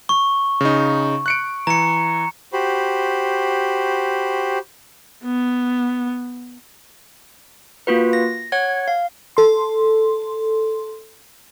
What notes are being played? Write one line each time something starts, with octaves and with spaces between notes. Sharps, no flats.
C#6
C#3 D#4
F#6 C#7 D7
E3 A#5 C#7
F#4 G4 C5 B5
B3
A#3 F4 F#4 B4
A#6
C#5 F#5 G#6
F5
A4 C6